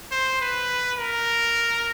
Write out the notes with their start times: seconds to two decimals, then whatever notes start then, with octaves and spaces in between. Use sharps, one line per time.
0.11 C5
0.41 B4
0.98 A#4